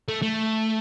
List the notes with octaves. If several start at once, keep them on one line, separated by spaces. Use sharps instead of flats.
A3
A3